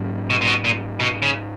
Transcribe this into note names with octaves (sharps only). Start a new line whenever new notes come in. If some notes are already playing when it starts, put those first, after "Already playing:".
Already playing: G#2 F#3 A#3 C#4
B2
A#2
B2
A#2
B2
C#3